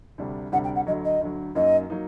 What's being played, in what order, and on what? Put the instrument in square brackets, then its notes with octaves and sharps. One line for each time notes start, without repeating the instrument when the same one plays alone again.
[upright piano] D2 C3 G3 D4
[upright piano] D2 C3 G3 D4 [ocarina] F#5
[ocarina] G5
F#5
[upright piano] D2 D3 F#3 [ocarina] D#5
[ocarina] D#5
[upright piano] D2 D3 F#3
[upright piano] F#2 F#3 A#3 D#4 [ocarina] D#5
[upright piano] F#3 A#3 D#4